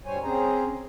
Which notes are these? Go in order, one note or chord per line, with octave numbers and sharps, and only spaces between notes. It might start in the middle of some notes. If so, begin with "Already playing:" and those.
D2 G2 G3 C5 C#5 G#5
C4 C#4 G#4 C5 A#5